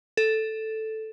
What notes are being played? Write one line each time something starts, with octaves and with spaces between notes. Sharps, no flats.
A4